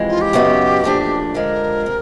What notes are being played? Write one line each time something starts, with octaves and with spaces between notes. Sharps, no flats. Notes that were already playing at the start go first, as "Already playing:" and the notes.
Already playing: F2 C3 E3 G#3
F4
G4
F#2 C#3 F#3 B3 D#4
A#2 F3 A3 D4
D3 F3 G#3 A#4
C3